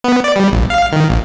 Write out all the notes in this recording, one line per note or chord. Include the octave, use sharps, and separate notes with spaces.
B3
D5
G3
A#1
F5
D#3
A#1